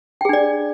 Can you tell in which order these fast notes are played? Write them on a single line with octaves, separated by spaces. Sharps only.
G5 G#4 D4 D5